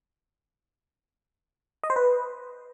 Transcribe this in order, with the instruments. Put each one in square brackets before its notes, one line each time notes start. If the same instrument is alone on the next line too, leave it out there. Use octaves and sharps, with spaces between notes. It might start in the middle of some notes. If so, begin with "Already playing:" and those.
[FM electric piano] D#5
C5
B4